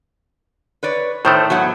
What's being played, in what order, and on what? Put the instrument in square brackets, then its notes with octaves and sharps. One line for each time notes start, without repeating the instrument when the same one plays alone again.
[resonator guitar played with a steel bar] B4 C#5 D5
[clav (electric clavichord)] A2 D#3 A3 [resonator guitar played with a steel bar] C5
[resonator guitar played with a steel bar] F#3 B3 F#5